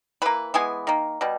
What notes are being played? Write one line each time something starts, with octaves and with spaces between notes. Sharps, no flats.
E3 A#3 B4
E3 G#3 B3 G#5
D#3 A#3
B2 G3